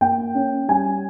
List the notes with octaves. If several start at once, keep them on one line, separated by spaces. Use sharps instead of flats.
A#3 G5
C#4
G3 G#5